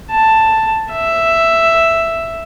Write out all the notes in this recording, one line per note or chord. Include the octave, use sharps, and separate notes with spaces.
A5
E5